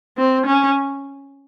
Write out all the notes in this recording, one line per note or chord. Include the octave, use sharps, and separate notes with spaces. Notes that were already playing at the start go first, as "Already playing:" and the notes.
C4
C#4